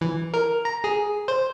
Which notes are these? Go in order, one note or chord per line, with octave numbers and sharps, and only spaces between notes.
E3
A#4
A#5
G#4
C5